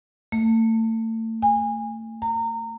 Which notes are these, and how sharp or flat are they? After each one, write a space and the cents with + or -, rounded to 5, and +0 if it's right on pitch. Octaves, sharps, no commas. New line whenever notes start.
A3 +35
G#5 -25
A#5 -25